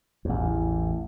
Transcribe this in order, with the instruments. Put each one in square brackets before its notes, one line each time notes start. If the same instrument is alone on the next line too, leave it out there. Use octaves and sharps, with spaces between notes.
[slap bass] A1 E2